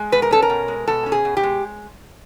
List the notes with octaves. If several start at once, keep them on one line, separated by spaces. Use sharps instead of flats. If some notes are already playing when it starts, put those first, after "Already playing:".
Already playing: G#3
B2 B4
A#4
C#4 A4
A#4
B2
G#3
B2 A4
C#4
G#4
B2
G4
G#3